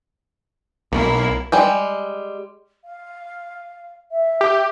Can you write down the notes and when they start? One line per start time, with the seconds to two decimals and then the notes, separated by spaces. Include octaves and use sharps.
0.92 B1 A#3 E4
1.52 G3 G#3 G5
2.84 F5
4.11 E5
4.41 G4